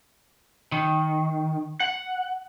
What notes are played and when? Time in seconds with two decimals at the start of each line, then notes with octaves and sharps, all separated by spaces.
0.72 D#3
1.80 F#5